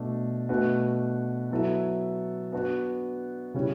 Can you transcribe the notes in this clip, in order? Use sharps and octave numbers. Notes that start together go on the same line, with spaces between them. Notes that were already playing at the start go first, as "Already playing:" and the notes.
Already playing: B2 A3 D4
B2 A3 D4 F#4 B4
F#3 B3 E4 A4 E5
B3 D4 F#4
C#3 G3 C#4 E4